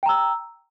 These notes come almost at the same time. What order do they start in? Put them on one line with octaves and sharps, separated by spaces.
G5 A#5 E6